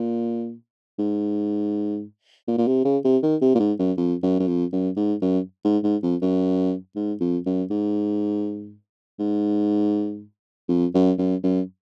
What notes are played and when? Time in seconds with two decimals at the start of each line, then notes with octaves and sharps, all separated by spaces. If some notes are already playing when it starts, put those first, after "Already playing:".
Already playing: A#2
0.99 G#2
2.48 A#2
2.58 A#2
2.67 C3
2.85 C#3
3.05 C3
3.23 D#3
3.41 C3
3.55 A#2
3.60 G#2
3.79 F#2
3.97 F2
4.23 F#2
4.40 F#2
4.48 F2
4.72 F#2
4.97 G#2
5.22 F#2
5.65 G#2
5.84 G#2
6.03 F2
6.22 F#2
6.96 G#2
7.20 F2
7.46 F#2
7.71 G#2
9.19 G#2
10.69 F2
10.95 F#2
11.18 F#2
11.44 F#2